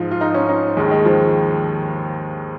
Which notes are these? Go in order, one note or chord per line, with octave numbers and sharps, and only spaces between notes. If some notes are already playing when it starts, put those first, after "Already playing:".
Already playing: G#2 F3 F4
F4
D#4
C#4
D#4
D#2 D#3 G#3
G#3
F3